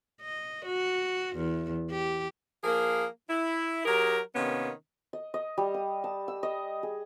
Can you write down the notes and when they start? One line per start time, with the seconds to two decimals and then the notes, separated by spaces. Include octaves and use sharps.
0.21 D#5
0.65 F#4
1.36 E2
1.90 G4
2.64 F3 A#3 G#4 A#4
3.30 E4
3.85 F#3 G4 G#4 A#4
4.35 C3 D#3 A#3 B3 C#4
5.13 D#5
5.34 D#5
5.58 G3
5.74 D#6
6.04 A5
6.28 E6
6.43 D#5
6.83 G#4